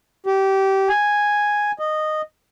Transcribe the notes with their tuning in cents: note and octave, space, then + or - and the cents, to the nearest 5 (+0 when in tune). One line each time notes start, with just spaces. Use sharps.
G4 -20
G#5 -5
D#5 -10